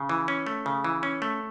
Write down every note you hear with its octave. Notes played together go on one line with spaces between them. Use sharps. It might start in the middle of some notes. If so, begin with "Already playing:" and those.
Already playing: C#3
E3
C#4
A3
C#3
E3
C#4
A3